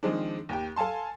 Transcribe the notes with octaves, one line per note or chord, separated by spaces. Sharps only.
D#3 F3 G#3 C4 D4
D#2 G4 G5
A4 F5 G#5 A5 C6